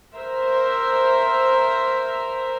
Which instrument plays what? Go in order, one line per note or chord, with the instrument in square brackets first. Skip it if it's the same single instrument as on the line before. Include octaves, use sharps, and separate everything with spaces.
[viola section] A#4 C5 E5 A#5